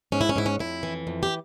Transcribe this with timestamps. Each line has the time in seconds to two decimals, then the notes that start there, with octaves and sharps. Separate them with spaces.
0.12 G#2 C#4
0.21 E4
0.29 C#4
0.36 G#2 E4
0.46 C#4
0.59 F2 E4
0.83 E3
1.07 F2
1.23 G4